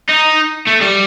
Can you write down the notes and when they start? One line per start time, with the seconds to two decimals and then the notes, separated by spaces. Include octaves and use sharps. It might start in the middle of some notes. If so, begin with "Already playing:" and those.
0.09 D#4
0.67 A3
0.81 G3